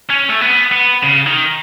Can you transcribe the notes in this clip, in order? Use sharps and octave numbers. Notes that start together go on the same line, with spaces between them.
C#4
A3
B3
B3
C#3
D#3